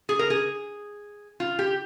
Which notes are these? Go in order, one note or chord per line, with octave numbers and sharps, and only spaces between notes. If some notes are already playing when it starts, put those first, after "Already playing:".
G#4
A#4
G#4
F4
G4